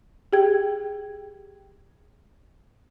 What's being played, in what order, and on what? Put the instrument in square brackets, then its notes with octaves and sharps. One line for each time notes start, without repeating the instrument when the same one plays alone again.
[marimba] G4 G#4 G5 G#6